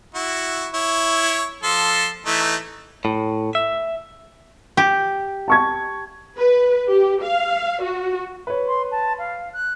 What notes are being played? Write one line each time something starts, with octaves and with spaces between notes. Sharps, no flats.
E4 F#4
E4 C#5
F3 A4 C6
E3 A3 D#4
A2
E5
G4
A5 C#6 G#6
B4
G4
F5
F#4
B4 C#5
C6
A5
F5
F#6